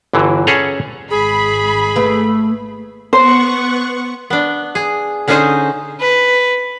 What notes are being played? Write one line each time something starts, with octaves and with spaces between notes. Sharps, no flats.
G1 D3 E3 F#3
C#4 G#4 A4 C#5 F#5 A#5
G#1 G#4 B5
A3 B4
B3 C5 F#5 C#6
B3 D4
G#4
D3 C#4 D#4 G#4 C5 D#5
B4